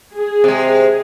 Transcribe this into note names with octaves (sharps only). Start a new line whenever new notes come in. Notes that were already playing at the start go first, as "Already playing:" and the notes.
G#4
C3 G#3